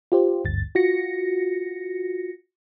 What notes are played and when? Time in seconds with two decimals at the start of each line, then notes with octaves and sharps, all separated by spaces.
0.12 F4 G4 C5
0.44 G#1 D2 G2 A6
0.75 F4 F#4 A#6 C#7